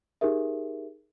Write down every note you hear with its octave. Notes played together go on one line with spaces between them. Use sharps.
D#4 G4 G#4 A#4 E5